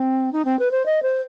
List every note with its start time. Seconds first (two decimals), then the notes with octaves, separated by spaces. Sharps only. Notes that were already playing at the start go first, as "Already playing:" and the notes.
Already playing: C4
0.32 D#4
0.45 C4
0.59 B4
0.71 C5
0.86 D#5
1.03 C5